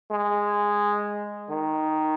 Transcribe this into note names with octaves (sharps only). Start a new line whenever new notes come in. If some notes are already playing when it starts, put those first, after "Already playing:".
G#3
D#3